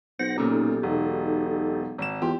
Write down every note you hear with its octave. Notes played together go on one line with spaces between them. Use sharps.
B1 C5 F#5 A#6
A#2 C#3 D#4 G4 A4
E1
G#1 E7
E2 F4 G4